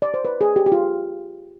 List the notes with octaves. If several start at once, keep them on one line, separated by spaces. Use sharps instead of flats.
D5
C5
B4
G#4
G4
G4
F4